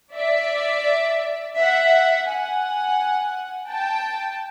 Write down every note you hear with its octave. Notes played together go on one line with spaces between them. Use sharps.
D5 E5
E5 F#5
F#5 G#5
G5 A5